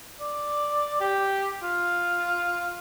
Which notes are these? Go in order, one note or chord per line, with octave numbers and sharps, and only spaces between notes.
D5
G4
F4